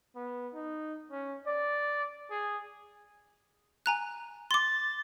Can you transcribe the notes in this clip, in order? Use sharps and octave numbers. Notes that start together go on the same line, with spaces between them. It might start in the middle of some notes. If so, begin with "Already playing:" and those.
B3
D#4
C#4
D5
G#4
G#5 A#5 F#6
C6 D6 A6